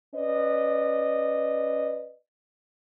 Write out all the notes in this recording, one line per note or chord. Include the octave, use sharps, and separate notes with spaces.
C#4 B4 D5 D#5